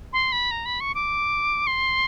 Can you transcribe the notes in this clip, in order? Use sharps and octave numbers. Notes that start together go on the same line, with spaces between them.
C6
B5
A#5
B5
C#6
D6
C6